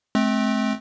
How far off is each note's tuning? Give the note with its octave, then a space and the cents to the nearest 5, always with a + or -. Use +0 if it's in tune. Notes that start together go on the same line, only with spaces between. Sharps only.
A3 -40 C4 +0